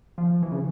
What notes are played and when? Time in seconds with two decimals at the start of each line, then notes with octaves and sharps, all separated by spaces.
0.18 F3
0.42 E3
0.52 C#3